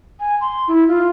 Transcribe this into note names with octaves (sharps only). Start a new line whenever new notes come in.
G#5
C6
E4
F4